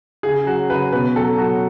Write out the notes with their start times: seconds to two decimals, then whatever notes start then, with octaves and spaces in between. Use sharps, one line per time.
0.23 C#3 G#4
0.46 F#3 F#4
0.69 C#3 B4
0.92 B2 B4
1.16 F#3 A4
1.38 F#3 F#4